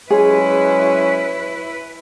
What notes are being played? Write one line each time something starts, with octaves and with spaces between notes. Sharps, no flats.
F#3 G#3 C#4 E4 G#4 B4